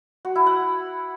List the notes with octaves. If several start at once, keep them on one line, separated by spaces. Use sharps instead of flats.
F#4
E4
F#5